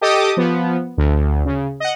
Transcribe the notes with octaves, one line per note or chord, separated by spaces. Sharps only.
G4 A4 D#5 D6 D#6
F3 B3
D2
C#3
D#5 F#5